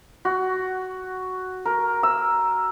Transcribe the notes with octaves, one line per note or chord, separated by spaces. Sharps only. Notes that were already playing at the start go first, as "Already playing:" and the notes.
F#4
A#4
E6